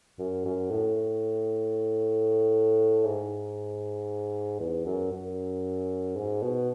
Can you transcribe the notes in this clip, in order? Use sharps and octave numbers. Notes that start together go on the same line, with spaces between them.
F#2
F#2
A2
G#2
E2
F#2
F#2
G#2
B2